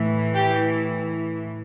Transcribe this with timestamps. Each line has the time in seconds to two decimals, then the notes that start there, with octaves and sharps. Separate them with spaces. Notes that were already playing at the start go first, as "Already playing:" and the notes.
Already playing: A2 E3
0.35 G4